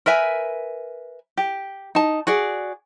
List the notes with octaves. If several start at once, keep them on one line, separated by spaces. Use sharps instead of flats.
A#4 B4 E5 G#5
G4
D#4 A5
F#4 G#4 D5